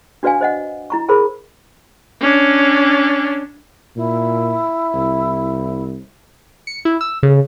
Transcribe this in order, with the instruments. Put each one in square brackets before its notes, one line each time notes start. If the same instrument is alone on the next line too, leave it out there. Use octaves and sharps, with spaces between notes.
[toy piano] D4 F#4 B4 D5 F5 G#5
C5 D#5 F#5
E4 A#5 C#6
G#4 A#4 C5 B5
[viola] C#4 D4
[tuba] A#2 [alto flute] E4
[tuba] C2
[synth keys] C#7
E4
E6
C#3